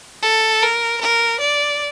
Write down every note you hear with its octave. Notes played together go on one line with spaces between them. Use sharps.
A4
A#4
A#4
D5